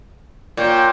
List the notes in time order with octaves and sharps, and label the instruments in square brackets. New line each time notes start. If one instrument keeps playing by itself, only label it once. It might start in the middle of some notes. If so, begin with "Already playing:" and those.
[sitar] A#2 [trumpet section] C#5 G5